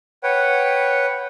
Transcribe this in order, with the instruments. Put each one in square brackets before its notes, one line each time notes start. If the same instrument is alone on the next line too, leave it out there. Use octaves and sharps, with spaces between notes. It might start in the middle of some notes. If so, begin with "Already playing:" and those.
[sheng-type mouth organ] B4 C#5 F#5 G5